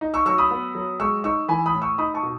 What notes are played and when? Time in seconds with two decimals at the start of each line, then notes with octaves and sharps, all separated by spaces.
0.01 D#4
0.14 C#6 E6
0.26 F#3 C#6 E6
0.38 B5 D#6
0.51 B3
0.75 F#3
1.00 G#3 C#6 E6
1.24 D#4 C#6 E6
1.48 E3 G#5 B5
1.66 B5 D#6
1.73 A2
1.82 C#6 E6
1.98 D#4 B5 D#6
2.14 A5 C#6
2.23 B2